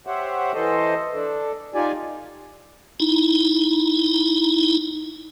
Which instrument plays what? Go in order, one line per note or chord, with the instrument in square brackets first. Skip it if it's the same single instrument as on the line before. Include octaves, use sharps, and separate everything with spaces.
[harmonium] G4 C5 C#5 E5 F#5
E3 A4 C5 D#5
D4 A4
D#4 F4 G4 D5 G#5
[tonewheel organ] D#4 E4